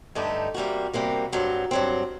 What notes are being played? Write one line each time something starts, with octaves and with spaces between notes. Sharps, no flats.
G2 D3 A3 D#4 G4
C3 G3 A#3 F#4
C3 G3 A#3 F#4
G2 F#3 C4
G2 F#3 C4